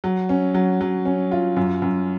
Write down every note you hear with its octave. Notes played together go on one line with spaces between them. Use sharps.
F#3
C#4
F#3
F#3
C#4
F4
F#2
F#2